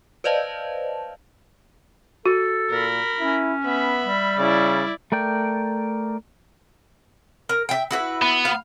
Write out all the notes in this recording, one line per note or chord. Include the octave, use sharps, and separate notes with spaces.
B4 C5 D5 D#5 F5 A5
F#4 A4
A#2 A#4 B5
C#4 E4
B3 E5 B5
G3
C#3 E4 D5
A3 A#4 D5 G5
A#4
E5 G5
E4 F#4 B4
B3
F5